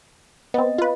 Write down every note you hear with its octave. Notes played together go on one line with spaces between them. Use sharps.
B3 C4 D#5
F4 B4